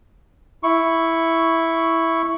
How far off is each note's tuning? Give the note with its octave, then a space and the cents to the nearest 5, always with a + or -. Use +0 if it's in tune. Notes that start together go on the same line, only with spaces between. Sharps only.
E4 +0 C#6 +0